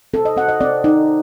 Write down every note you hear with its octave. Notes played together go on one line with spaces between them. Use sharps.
C4 A4
D#5
C4 F#5
D#5
C4 D5
D#4